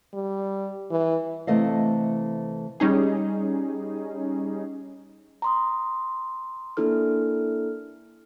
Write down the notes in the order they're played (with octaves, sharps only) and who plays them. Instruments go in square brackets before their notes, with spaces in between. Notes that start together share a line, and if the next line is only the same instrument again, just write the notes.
[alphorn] G3
E3
[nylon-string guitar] C3 E3 A3 A4 D#5 F5
[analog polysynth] G3 C#4 D#4 G#4
[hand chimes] A#5 C6 D#6
A#3 D4 E4 A4 F6